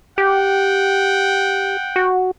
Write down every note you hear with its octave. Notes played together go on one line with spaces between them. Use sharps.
G4 F#5 G5
F#4